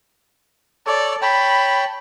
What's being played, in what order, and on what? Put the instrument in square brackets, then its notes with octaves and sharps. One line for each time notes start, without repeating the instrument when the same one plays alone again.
[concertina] A4 C#5 [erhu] D5
[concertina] C#5 G5 A5 [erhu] B5